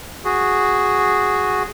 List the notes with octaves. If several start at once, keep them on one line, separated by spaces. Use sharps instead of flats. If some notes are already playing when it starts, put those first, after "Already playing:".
F#4 G#4